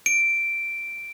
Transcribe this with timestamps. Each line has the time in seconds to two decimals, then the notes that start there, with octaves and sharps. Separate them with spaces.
0.06 D7